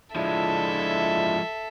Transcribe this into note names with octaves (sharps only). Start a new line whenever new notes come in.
F3 G#3 D4 E4 F4 A4 E5